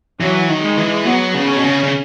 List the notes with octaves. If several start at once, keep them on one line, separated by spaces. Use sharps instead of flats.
E3 F#3
D#3
G#3
E3
F#3 B3
C#3
C#4
B2
C#3
C#3